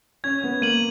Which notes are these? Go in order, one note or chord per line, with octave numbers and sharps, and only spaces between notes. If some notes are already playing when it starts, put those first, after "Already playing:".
C#4 G#6
B3
A#3 D#7 F#7